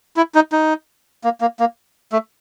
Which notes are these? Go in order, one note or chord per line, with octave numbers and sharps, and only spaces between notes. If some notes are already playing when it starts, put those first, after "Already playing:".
E4
D#4
D#4
A#3
A#3
A#3
A3